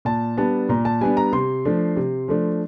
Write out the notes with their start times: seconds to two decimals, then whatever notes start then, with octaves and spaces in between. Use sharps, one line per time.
0.05 A#2 A5
0.37 G3 B3 D4 A5
0.69 A#2 A#5
0.85 A5
1.01 G3 B3 D4 G#5
1.17 A#5
1.32 C3 C6
1.65 F3 A3 D4
1.96 C3
2.28 F3 A3 D4